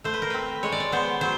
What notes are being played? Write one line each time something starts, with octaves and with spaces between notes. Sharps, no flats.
A3 C5
B4
A#4
C4 B4
G#3 C#5
D5
C#5
B3 C5
F#3 C5